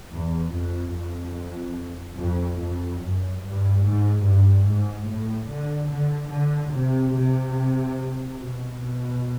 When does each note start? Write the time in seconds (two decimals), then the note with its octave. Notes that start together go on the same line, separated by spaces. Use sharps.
0.12 E2
0.53 F2
0.94 F2
2.18 F2
2.60 F2
3.01 F#2
3.42 G2
3.84 G#2
4.25 G2
4.66 G#2
5.08 A2
5.49 D3
5.91 D3
6.31 D3
6.73 C3
7.14 C3
8.39 B2
8.80 B2